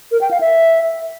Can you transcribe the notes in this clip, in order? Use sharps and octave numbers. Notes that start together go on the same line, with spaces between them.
A#4
G5
F5
E5